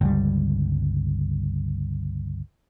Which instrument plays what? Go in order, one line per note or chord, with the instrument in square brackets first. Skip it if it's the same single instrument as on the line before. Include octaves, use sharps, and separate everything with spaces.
[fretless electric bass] G1 C#2 G3